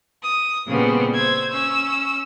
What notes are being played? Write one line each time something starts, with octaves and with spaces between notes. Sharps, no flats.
D#6
A#2 C#3 G3 B3 C4
C5 E6 G#6
C#4 E6